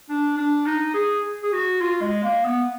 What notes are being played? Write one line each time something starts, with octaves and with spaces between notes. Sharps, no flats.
D4
D4
D#4
G#4
G#4
F#4
F4
G#3
A#3
B3